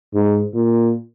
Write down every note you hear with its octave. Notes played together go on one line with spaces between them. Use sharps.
G#2
A#2